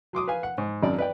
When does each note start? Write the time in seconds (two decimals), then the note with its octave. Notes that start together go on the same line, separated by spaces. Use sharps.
0.13 F#3 C6 D6 D#6
0.28 B4 F5 G#5
0.43 F#5
0.58 G#2
0.83 G#1 F#2 D5
0.98 B4 D5 G5